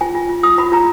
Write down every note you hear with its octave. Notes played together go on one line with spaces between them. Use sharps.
F4 G#5
F4
F4
F4 D#6
F4 B5
F4 A#5